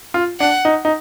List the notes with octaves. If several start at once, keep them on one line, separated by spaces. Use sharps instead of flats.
F4
D4 F#5
D#4
D#4